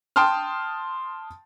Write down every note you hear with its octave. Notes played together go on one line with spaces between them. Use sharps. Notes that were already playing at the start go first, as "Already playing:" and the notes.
G5 A5 C6 D#6 F6